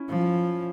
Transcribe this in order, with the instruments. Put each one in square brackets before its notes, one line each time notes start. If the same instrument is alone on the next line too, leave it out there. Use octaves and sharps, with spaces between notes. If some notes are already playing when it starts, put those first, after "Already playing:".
Already playing: [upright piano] C#4 E4
[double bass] F3